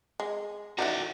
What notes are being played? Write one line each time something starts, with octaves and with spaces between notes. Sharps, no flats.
G#3
E3 D4 D#4 F#4 D5